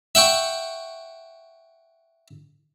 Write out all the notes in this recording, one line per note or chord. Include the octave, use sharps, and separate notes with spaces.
E5 F#5 G5 C#6